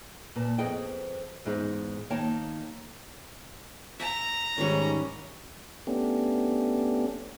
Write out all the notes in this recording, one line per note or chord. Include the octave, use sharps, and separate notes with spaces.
A#2 B4 A5
F2 B3 G#4 C5 D#5 G5
E2 G#2 C#4 D#4 G#4
D#3 A#3 D#4 C#5 G5 A5
E5 A#5
G#2 D#3 G3 C#4
A3 B3 C#4 D4 G4